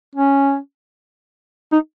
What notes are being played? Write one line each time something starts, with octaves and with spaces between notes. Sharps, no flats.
C#4
D#4